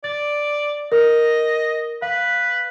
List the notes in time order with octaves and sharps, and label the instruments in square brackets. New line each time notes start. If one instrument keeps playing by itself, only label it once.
[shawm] D5 [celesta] A6
[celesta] A#4 [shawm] D#5
[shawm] B4 [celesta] F5